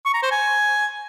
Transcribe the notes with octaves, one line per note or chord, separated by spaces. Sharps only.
C#6
A#5
C5
G#5